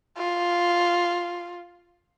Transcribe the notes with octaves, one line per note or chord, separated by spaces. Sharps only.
F4